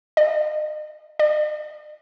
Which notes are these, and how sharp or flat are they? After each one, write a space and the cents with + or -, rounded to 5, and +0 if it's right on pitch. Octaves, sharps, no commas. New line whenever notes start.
D#5 -35
D#5 -45